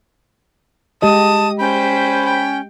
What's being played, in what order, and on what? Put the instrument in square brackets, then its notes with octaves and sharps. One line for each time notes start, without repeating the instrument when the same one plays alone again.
[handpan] G#3 G4 D#5 [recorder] A5 [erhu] D#6
[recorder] C#4 [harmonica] C5 B5 [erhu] G5
[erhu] G5